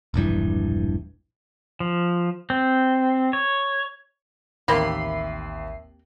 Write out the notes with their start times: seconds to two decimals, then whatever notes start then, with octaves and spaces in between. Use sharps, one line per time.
0.14 E1 A#1 G2 E3
1.80 F3
2.50 C4
3.33 C#5
4.68 A1 D#2 A#3 C4 G4 E5 B5 C7